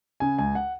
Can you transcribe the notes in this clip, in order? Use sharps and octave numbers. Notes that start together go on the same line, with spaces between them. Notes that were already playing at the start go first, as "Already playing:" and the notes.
C#3 G#5
C#2 G#5
F#5